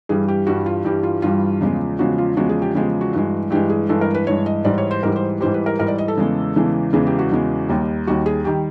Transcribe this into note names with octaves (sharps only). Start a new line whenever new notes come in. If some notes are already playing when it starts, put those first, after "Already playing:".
G2 E3 G3 G#4
G4
G2 E3 G3 F#4
F4
G2 E3 G3 G4
F4
G2 E3 G3 F4
E2 C#3 F3 G#3
E2 C#3 F3 G#3 F#4
F4
E2 C#3 F3 G#3 F#4
G#4
G4
E2 C#3 F3 G#3 G4
F#4
G2 E3 G#3
G2 E3 G#3 G4
G#4
G2 E3 G#3 A4
A#4
B4
G2 E3 G#3 C#5
D#5
G#2 E3 G3 D5
C#5
C5
G#2 E3 G3 A#4
C5
G#2 E3 G3 C5
B4
A#4
G#2 E3 G3 A#4
D5
D#5
A4
E2 C#3 E3 G#3
E2 C#3 E3 G#3
E2 C#3 E3 G#3 G#4
G4
F#4
E2 C#3 E3 G#3
D#2 D#3 G3
D#2 D#3 G3 F#4
G#4
D#3 G3 G4